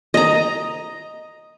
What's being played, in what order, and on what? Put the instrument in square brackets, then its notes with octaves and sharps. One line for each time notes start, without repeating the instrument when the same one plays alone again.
[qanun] D#5 A#5